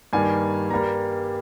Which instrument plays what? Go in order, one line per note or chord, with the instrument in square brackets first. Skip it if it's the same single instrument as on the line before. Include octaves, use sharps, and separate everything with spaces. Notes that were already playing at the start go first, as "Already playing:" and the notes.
[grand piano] G2 D#3 G3 A#3 G#5
G2 G3 A#3 A#5